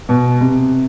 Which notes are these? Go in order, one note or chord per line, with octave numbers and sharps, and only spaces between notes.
B2
C3